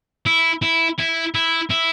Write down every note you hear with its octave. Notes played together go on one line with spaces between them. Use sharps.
E4
E4
E4
E4
E4